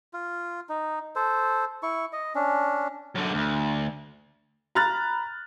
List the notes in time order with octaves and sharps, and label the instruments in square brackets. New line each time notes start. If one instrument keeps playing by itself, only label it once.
[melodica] F4
D#4
A4 C5
E4 C#6
D#5
C#4 D4
[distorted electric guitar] F#2 D3
D2
[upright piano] A#5 B5 F6 F#6 A6